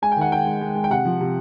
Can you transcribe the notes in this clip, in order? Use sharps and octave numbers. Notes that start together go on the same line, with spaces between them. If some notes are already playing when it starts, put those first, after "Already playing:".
G#3 G#5
G5
D#3 F#5
G#3 G5
G#3
G#3
G#3
G5
C3 F#5
F3
C3